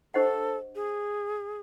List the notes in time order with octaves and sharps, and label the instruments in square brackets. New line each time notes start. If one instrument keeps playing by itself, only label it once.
[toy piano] D4 G4 C5 D#5 F#5 [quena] A4
[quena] G#4